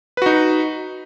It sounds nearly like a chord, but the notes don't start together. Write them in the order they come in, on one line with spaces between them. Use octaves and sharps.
B4 F#4 D#4